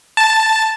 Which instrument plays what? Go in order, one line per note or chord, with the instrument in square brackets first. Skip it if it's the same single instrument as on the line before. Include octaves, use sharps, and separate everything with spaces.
[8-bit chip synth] A5